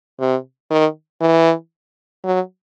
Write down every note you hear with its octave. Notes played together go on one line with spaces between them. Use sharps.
C3
D#3
E3
F#3